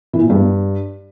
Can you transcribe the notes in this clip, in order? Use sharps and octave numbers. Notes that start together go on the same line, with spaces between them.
E3
A#2
G2